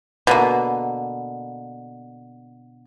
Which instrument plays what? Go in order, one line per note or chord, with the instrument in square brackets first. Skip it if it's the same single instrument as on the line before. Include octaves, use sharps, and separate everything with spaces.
[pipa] B2 D3 A#3